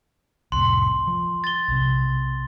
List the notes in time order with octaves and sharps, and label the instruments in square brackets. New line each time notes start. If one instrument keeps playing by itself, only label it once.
[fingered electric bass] C2 F2 A2 [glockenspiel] C6
[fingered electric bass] F3
[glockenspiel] A6 G7
[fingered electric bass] B1 C3